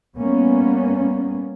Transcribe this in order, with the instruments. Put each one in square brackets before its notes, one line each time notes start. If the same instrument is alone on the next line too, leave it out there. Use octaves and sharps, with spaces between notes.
[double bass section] G3 A#3 B3 C#4